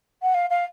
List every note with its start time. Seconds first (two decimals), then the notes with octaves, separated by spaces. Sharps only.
0.22 F#5
0.34 F5
0.50 F5